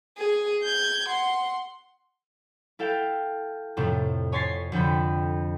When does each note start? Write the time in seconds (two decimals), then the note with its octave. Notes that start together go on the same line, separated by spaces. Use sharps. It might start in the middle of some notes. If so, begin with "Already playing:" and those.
0.17 G#4
0.63 G6 G#6
1.09 F#5 C6
2.79 E4 A4 F5 G5
3.77 F2 A2 C3 F3
4.32 C#5 G#5 C6 A6 B6 C7
4.72 F2 D3 G5 B5